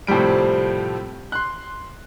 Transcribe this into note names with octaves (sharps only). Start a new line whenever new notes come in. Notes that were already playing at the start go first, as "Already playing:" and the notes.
A2 C3 F3 G3 D7
C6 F#6